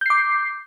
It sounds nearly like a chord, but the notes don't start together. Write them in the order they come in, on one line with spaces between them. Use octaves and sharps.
G6 C7 D6